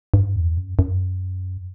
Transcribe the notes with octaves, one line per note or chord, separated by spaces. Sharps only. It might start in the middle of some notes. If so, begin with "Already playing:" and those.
G2
E2
F#2
F#2